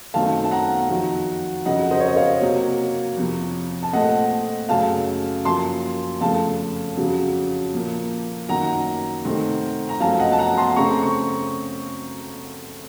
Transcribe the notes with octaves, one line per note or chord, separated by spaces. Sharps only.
F#2 D#3 A3 C4 F5 A5
A5
F#5 A#5
F2 D#3 F#3
F2 C#3 F#3 D#5 F#5
C5 D#5
C#5
D#5
C#5 F5
C3 F#3 A#3
F2 C3 F3
A5
A#2 A3 C4 D#5 F#5
F#2 C#3 A3 F5 A5
F#2 F3 A#3 A5 C6
F2 C#3 A3 F5 A5
F2 C#3 F#3
A#2 F3 A#3
F#2 D#3 A#3 F#5 A#5
C3 D#3 A3 C4
A#5
F#2 F3 A3 C4 F5 A5
D#5 F#5
A5
F#5 A#5
A5 C6
C#3 A3 C4 A#5 C#6
C#6